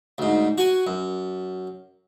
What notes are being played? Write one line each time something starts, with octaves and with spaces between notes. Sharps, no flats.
D2 G#2
F#4 G#5
F#2